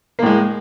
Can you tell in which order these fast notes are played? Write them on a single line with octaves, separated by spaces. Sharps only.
A#3 A2 G#3